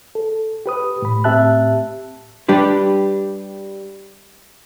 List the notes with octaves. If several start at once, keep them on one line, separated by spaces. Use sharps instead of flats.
A4
G4 B4 D#6
A2 B5
A2 C4 G4 E5 A5 F#6
G3 D4 G4 B4